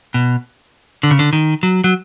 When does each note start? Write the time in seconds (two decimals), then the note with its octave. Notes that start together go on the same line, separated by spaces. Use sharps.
0.14 B2
1.03 D3
1.11 C#3
1.19 D3
1.33 D#3
1.63 F#3
1.84 F#3